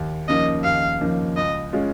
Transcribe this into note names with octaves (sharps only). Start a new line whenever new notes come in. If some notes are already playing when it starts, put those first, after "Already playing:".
Already playing: D#2
C#3 F3 A#3 D#4 D#5
D#2 F5
C#3 F3 A#3 D#4
C#2 D#5
C#3 G#3 C#4 F4